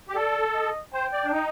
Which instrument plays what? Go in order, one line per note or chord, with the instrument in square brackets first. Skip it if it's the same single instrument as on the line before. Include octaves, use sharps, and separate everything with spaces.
[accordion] G4
[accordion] A4 [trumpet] D5
[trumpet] D#5
[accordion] C5 [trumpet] G5
[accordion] D5
D4
D#4